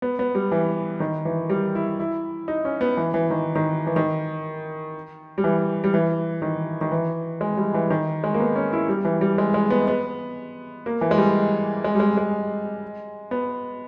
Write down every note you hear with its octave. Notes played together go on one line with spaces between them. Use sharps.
B3
B3
G3
E3
D#3
E3
G3
E4
E4
D#4
C#4
B3
E3
E3
D#3
D#3
E3
D#3
G3
E3
G3
E3
D#3
D#3
E3
G#3
G3
E3
D#3
G#3
A#3
B3
C#4
E4
G3
E3
G3
G#3
G#3
B3
B3
A#3
E3
G#3
G3
G#3
G3
G#3
G#3
B3